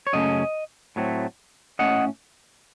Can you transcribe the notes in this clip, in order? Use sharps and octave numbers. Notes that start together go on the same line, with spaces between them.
C#5
F#2 C#3 A3 C#4 D#5
A2 F#3 A3 C4
A2 A3 C#4 D#5 F#5